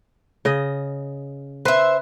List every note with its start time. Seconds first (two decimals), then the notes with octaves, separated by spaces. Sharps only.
0.45 C#3 D#5
1.65 B4 C5 E5